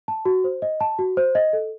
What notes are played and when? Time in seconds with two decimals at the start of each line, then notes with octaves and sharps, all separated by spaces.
0.08 A5
0.25 F#4
0.44 C5
0.62 D#5
0.81 A5
0.99 F#4
1.17 C5
1.35 D#5
1.53 A4